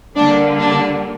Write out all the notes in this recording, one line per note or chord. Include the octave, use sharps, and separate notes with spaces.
D3 G3 A#3 D4
D4